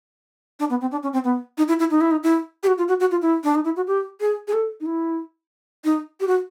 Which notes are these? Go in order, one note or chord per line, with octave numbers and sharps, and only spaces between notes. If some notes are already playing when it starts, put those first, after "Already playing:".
D4
B3
C4
D4
C#4
C4
B3
D#4
E4
E4
D#4
E4
D#4
E4
G4
F#4
F4
F#4
F#4
F4
E4
D4
D#4
E4
F#4
G4
G#4
G#4
A4
D#4
E4
D#4
G4
F#4